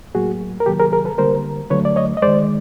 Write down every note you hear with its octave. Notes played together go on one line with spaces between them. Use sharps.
A2 F#3 A#3 F#4 G#4
A#4
C3 D#3 F#3 A#3 G4 A4
G#4 A#4
G#4 A#4
A4 B4
D3 G3 A#3 A#4 C5
D3 F#3 A3 B4 C#5
D5
C#5 D#5
D#5
D#3 G#3 C5 D5